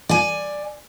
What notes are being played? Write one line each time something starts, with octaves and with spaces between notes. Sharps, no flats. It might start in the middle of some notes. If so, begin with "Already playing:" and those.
D5 G#5